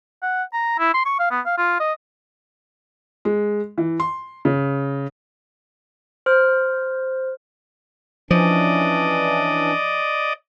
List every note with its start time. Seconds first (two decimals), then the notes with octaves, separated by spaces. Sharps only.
0.22 F#5
0.53 A#5
0.79 E4
0.94 C6
1.06 C#6
1.19 F5
1.31 B3
1.46 F5
1.58 F4
1.80 D#5
3.25 G#3
3.78 E3
4.00 C6
4.45 C#3
6.26 C5 F6
8.31 E3 F3 C#4 D4 D5 D#5